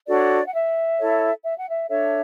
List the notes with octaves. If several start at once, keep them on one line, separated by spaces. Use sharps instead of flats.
D4 F#4 A4 C#5 D5
F#5
E5
E4 A4 C#5
E5
F#5
E5
D4 A4 C#5 E5